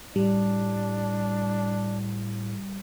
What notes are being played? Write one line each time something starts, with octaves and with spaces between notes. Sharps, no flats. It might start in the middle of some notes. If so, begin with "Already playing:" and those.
A2 G3 D4